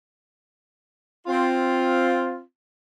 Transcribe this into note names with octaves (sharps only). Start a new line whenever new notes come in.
C4 F4